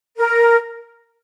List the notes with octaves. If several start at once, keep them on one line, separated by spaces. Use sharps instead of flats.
A#4